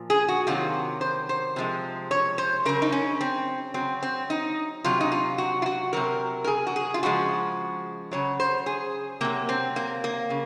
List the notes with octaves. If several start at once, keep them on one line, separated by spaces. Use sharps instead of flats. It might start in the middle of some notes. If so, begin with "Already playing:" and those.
Already playing: A#2 F3
G#4
F#4
C3 D#3 F#3 F4
C5
C5
C3 F3 G#3
C#5
C5
C#3 F#3 A#4
D#4
C#4
C4
C#3 F#3 C4
C4
D#4
C3 F#3 F4
D#4
F4
F#4
F4
F#4
C3 F#3 A#4
A#4
G#4
F#4
G#4
F4
C#3 F3 G#3 F#4
C#3 F#3 C#5
C5
G#4
C3 F#3 A#3
C4
A#3
A#3
C#3